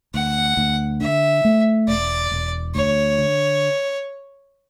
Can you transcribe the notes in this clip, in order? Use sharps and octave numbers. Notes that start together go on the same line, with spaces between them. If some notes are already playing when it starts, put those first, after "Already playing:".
D2 F#5
D2
D3 E5
A3
E1 D5
E1
D2 C#5
D3